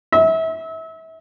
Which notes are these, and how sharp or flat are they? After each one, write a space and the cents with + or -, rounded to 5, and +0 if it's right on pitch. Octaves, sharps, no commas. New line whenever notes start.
E5 -30